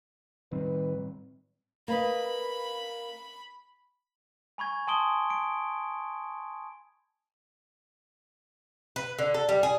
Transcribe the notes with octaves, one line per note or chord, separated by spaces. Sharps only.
A2 D#3 G3 C4 B4
A#3 B4 D#5 B5
G#5 B5 C#6 G#6
G#5 A5 C6 D#6 D7 G7
D7
B4
D3
A4
G3
G#4